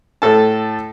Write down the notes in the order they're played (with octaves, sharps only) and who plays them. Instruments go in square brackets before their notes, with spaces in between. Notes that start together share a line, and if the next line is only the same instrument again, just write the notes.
[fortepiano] A2 A4 A5